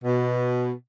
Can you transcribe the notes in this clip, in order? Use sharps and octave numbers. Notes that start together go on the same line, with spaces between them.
B2